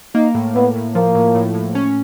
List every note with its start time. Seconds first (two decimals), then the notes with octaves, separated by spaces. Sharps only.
0.15 A#3 D#4
0.35 A2
0.55 A2 B3
0.75 A2
0.95 F3 A#3
1.15 A2
1.35 A2
1.55 A2
1.75 C#4